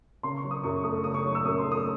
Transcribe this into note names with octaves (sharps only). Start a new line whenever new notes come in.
C#3 C6
C#6
F#3
D#6
F#2 C#6
A3 D#6
C#3 D#6
C#6
F#3
E6
F#2 D#6
C6
A3
D#6